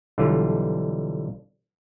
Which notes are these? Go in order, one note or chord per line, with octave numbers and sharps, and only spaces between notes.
B1 D3 E3 G3 F4